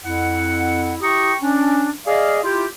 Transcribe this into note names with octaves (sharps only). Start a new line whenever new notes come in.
F2 E4 F#5
E4 G4 G5 A#5 C#6 D#6
C#4 D4
G#4 D5 D#5 F5
E4 F4 G4